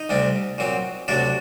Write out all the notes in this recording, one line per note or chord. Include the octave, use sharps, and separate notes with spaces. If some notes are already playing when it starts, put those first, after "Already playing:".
Already playing: D#4
D2 C3 G3 C4
A#2 F#3 C4
D2 C3 F#3 D4 F#4